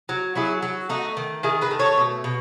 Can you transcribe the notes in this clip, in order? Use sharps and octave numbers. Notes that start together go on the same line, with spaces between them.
F#3
F#3 E4 G#4
F#3
A3 D#4 F#4
D#3
D#3 E4 G#4
G#4 B4
A3
A4 C#5
B2
B2